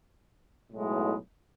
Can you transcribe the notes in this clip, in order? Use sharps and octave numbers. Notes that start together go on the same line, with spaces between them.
B1 A2 G#3